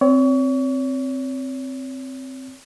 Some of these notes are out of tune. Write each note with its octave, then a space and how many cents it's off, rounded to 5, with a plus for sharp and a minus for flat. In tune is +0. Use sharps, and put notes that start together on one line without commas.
C4 +0 C#5 +35